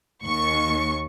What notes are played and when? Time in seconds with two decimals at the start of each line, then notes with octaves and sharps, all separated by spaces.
0.24 D#2 C#6